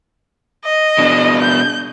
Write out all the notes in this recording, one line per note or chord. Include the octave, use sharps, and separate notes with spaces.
D#5
B2 D4
G6